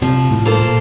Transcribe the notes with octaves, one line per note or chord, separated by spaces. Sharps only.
C3 F3
A2
A#3 F4 A4 C5
A#2